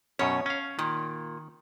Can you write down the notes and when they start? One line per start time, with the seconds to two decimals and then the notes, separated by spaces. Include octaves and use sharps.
0.19 F#2 B2 C#4 C#5
0.46 C#4 F5
0.79 A#2 D#3